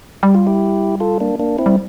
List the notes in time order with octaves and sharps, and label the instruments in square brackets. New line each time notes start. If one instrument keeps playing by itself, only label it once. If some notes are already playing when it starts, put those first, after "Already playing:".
[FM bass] G3 [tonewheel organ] G4
[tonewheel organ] F4
E4 G4
F4 A4
A#3 D4
A#3 D4
C4 E4
[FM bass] G3